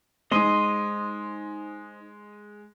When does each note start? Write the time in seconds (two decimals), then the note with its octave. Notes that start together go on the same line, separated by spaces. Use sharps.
0.31 G#3 D#4 C5 D#5 C6 D#6